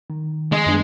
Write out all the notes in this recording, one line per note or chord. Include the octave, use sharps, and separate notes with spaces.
D#3
G#3
F#2 B3 D4